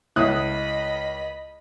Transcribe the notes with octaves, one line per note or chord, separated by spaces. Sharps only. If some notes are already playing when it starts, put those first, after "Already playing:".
C#2 E4 D#5 B5 D#6 F#6